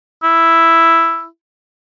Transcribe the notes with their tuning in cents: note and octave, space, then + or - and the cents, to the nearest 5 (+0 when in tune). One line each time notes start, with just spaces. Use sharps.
E4 +5